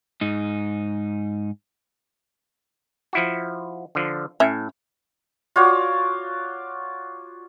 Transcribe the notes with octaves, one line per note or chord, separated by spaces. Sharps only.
G#2 D#4
F3 E4 F#4
D3 F3
A2 C#4 E5
F4 F#4 C#5 D5